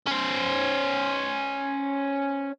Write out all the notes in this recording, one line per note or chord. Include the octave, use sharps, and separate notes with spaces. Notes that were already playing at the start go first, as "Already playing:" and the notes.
C#4 C5